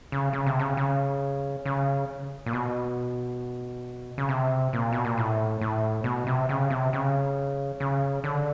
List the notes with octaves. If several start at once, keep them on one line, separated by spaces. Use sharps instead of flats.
C#3
C#3
C3
C#3
C#3
C#3
A#2
B2
C#3
C3
A#2
B2
A#2
A2
A2
B2
C3
C#3
C3
C#3
C#3
D3